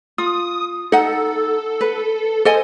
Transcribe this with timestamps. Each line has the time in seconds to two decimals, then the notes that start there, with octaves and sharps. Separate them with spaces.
0.18 F4 D#6
0.92 D#4 A4 F#5
1.81 B4
2.45 A4 C5 D#5 G#5